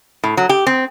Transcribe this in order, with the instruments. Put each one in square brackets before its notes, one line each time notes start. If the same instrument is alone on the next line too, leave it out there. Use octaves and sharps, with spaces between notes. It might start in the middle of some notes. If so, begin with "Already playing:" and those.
[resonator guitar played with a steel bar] A2
F#3
G4
C4